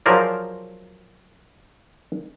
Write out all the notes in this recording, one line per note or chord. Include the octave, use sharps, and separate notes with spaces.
F3 F#3 G#4 A#4 C5 D5